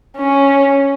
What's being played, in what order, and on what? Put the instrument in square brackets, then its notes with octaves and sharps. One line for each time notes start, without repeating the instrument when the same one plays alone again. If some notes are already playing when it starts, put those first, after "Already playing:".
[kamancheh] C#4